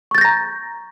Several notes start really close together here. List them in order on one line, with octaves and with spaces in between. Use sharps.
C#6 A6 G6 A#6 A#5